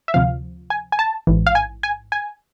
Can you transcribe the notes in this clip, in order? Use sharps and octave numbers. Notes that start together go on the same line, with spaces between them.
E5
D2 C3 F3 F5
G#5
G#5
A5
A1 G#2 E3
F5
G#5
G#5
G#5